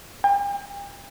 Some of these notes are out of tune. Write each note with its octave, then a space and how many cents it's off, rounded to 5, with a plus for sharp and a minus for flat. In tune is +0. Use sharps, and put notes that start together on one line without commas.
G5 +40